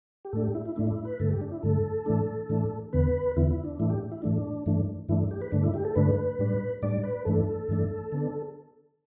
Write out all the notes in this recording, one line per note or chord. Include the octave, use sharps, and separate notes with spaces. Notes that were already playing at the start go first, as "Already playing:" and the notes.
G4
A2 A3 D4 A4
G4
E4
E4
A2 A3 D4 E4
D4
E4
B4
G2 D3 A3 A4
G4
D4
E4
G2 D3 A3 A4
A2 E3 A3 D4
A2 E3 A3 D4
E2 D3 B3 B4
E2 D3 B3 E4
E4
D4
A2 E3 A3 D4 E4
G4
E4
A2 E3 A3 D4
G2 E3 A3 D4
G2 E3 A3 D4 E4
G4
B4
G2 D3 A3 D4
E4
G4
A4
G2 D3 A3 D4 B4
A2 G3 D4
A2 G3 D4 D5
B4
G2 E3 A3 D4 A4
G2 E3 A3 D4
D3 B3 D4